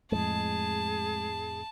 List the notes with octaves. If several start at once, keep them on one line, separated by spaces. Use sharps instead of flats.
F2 A2 G#3 G#4 A5